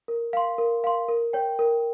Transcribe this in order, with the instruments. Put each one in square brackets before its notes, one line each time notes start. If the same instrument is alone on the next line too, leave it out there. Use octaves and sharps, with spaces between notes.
[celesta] A#4
F5 C6
A#4
F5 C6
A#4
C#5 G5
A#4